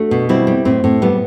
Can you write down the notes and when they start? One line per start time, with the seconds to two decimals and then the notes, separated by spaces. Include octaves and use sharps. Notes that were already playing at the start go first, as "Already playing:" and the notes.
Already playing: A3 D4 F#4
0.11 B2
0.29 G3 C4 E4
0.47 G3
0.65 A2 C4
0.84 A2
1.02 G3 B3